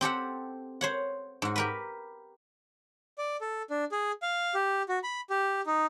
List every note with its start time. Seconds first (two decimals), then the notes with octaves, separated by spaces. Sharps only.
0.01 C4 G4 A4 F#5
0.81 C5 C#5 F#5
1.42 G#2 F#4
1.56 G4 A#4 B4
3.18 D5
3.41 A4
3.70 D4
3.92 G#4
4.22 F5
4.55 G4
4.89 F#4
5.04 B5
5.30 G4
5.67 D#4